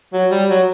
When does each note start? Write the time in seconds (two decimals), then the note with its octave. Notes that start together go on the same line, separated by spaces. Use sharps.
0.13 F#3
0.31 G3
0.49 F#3